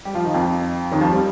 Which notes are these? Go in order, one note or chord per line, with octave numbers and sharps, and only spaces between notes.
G3 G4
F3 F4
D#3 D#4
F2 F3
D#2 D#3
F2 F3
G3